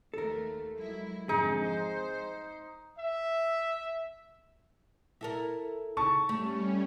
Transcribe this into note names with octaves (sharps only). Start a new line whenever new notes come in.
D#2 A3 A4 A#4
F#3 G#3 E4
F2 G#2 D3 D#4 G#4
C5
E5
E4 A4 A#4
C#3 A5 C#6
G3 A3 C#4